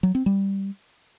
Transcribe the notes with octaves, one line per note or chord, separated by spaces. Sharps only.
F#3
C4
G3